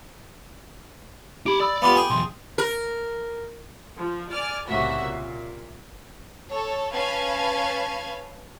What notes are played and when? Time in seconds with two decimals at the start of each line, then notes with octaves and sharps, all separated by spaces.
1.46 D#4 G4 B5 D6 D7
1.60 D5 B5 D#6 E6
1.82 B3 F4 G4 F5 B5 D6
1.96 G#4 G5
2.10 B1 E2 C6
2.58 A#4
3.99 F3
4.31 D5 G#5 F6
4.68 C2 A2 C#3 A#3 F#4 E5
5.04 A#2
6.49 A4 C#5
6.93 C#4 B4 F5 G#5 A5 G#6